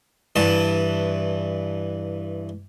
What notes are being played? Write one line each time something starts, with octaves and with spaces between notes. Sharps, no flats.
G2 E3 A5